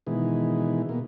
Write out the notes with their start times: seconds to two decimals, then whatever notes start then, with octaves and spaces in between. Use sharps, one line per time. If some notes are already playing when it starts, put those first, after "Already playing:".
0.07 B2 D#3 E3 G#3
0.89 B2 A#3